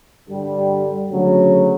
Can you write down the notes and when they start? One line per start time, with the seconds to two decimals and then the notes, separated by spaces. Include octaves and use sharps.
0.30 G2 D3 G3
1.09 D2 C#3 F#3